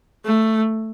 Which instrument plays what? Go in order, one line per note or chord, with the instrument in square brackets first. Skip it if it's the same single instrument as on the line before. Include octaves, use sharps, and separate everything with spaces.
[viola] A3